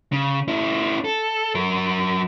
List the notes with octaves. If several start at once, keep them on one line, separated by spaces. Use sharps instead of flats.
C#3
C#4 E4
A4
F#3 A#4